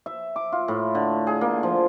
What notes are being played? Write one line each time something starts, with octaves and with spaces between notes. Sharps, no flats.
E5
D6
F4
A2
D3
G#4
A#3
F3